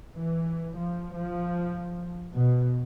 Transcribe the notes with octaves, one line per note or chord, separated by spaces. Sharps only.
E3
F3
F3
B2